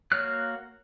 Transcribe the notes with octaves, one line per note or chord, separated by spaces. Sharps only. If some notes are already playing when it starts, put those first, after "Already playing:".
A#3 F#4 C#5 F6 F#6